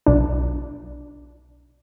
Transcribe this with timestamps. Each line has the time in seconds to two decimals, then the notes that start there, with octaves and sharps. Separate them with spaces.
0.06 B1 D4